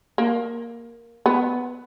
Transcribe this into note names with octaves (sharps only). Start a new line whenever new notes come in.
A#3
B3